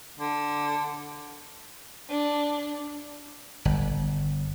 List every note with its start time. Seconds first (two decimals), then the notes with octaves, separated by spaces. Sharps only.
0.19 D3
2.10 D4
3.65 G1